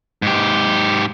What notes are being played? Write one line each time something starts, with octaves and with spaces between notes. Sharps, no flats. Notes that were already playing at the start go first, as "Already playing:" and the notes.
G#2 G4